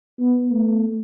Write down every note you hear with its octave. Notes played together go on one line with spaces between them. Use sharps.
B3
A3